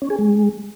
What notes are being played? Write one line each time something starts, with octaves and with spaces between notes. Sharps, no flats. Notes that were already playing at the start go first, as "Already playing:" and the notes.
C#4
G#4
G#3